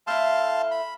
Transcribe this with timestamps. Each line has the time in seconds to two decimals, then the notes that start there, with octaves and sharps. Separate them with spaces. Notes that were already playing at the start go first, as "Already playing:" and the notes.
0.07 A3 E4 F5 A5 C6
0.71 B5